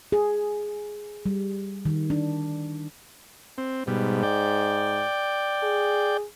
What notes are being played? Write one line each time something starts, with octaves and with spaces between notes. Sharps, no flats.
G#4
G3
D#3
D4
C4
G#2 B2 G3
D5 G5
G#4